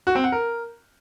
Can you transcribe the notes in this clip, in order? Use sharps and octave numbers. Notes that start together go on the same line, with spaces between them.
F#4
C4
F#5
A#4